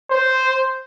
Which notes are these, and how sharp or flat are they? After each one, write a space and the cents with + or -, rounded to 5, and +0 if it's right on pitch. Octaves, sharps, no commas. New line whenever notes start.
C5 -5